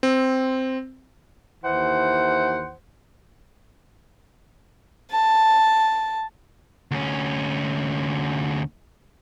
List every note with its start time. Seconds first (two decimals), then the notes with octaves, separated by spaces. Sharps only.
0.03 C4
1.64 D#2 E3 C5 F#5
5.11 A5
6.91 D2 C#4